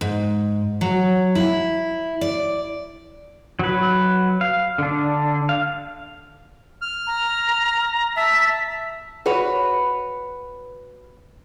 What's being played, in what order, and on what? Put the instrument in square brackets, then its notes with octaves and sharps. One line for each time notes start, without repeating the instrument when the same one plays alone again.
[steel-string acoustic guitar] G#2
F#3
E4
D5
[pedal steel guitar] F#3 B4
F5
D3 D4
F5
[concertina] F6
[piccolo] A#5
[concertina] E5 A5 [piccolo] B6
[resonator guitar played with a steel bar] F#4 B4 C#5